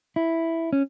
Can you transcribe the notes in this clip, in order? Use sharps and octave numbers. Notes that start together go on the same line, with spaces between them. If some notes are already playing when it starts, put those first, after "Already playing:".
E4
C#4